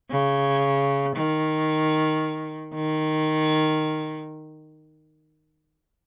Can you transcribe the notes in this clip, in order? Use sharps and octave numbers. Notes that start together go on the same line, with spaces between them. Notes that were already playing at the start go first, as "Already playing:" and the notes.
C#3
D#3
D#3